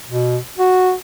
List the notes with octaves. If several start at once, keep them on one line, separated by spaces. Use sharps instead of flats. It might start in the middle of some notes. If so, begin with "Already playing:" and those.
B2
F#4